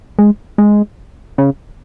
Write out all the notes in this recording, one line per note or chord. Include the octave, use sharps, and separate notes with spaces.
G#3
G#3
C#3